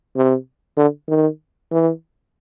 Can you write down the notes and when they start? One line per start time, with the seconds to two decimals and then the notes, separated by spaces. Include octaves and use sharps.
0.16 C3
0.77 D3
1.08 D#3
1.71 E3